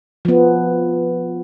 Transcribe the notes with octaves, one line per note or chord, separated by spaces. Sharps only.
F3 B3